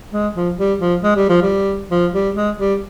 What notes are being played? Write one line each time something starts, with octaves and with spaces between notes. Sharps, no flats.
G#3
F3
G3
F3
G#3
G3
F3
G3
F3
G3
G#3
G3